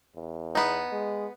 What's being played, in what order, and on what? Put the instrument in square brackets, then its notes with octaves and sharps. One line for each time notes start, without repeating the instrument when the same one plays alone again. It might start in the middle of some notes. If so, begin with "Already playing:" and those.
[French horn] E2
[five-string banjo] B3 D#4
[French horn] G#3